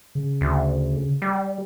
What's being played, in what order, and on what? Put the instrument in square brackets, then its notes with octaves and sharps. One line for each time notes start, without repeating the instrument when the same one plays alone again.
[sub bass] C#3
[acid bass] D2
G3